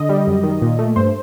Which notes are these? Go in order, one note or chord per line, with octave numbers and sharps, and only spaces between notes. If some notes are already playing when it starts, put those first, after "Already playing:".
Already playing: D3 D#5
G3
F#2
D#3
A#2
A3
G2 C5